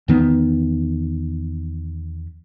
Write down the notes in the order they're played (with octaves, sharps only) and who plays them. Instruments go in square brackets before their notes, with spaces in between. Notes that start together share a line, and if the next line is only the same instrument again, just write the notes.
[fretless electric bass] E2 D#3 B3